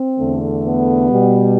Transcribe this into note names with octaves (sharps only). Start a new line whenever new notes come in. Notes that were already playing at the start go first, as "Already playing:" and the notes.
Already playing: C4
E2 D3 A3
B3
B2 G3